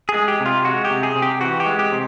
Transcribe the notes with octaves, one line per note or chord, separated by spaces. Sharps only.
G#4
G#3
G4
C3
F4
G#3 F#4
G4
C3
G#4
C3
G4
E3 F#4
G4
G#3
G4
C3